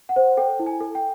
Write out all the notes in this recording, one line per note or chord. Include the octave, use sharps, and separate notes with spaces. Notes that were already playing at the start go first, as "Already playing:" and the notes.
F#5
C5
A4 G5
E4
G#5
A4
G5